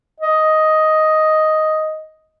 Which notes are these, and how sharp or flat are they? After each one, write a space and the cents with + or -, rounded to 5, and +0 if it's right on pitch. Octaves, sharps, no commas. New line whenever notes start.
D#5 +5